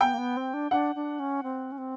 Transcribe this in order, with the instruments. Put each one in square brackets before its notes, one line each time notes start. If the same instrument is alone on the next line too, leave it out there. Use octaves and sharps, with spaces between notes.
[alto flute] B3 [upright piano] G5
[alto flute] A#3
B3
C4
D4
[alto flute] D4 [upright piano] F#5
[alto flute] D4
C#4
C4
C#4
C4